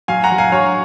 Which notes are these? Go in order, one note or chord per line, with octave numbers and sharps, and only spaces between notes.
F#3 F5 G#5
F#5 A#5
F#3
F5 G#5
F#3 C#5 F5